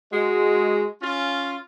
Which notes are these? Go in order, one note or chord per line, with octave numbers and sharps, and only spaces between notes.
G#3 F#4
C#4 F4